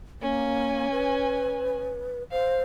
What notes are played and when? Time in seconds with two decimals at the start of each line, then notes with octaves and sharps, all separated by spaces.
0.21 A#3 C#4 G#5
0.91 B4
2.31 C5 F5